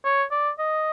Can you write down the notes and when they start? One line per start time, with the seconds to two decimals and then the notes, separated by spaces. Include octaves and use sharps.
0.05 C#5
0.31 D5
0.59 D#5